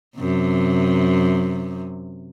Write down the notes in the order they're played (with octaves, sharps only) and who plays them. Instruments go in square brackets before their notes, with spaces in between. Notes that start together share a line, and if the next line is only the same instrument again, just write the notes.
[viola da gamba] F#2 C3